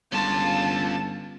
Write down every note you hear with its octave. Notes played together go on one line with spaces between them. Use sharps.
G1 C#4 F4 A5